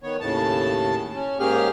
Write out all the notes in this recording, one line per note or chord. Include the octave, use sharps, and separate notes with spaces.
D#3 B3 C#5
D#2 A2 C#3 A5
C#4
G#2 A#3 C#4 G4 G#4 F6